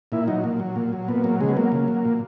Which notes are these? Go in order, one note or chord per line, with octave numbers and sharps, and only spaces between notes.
A#2 E4
F#3 D#4
A#2
F#3
A#2
F#3
A#2 B3
F#3 A#3
C#3 G#3
B3
F#3 A#3
C#3
F#3
A#2